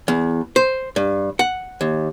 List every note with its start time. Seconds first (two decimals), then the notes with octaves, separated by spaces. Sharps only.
0.08 E2
0.56 C5
0.96 G2
1.39 F#5
1.81 D#2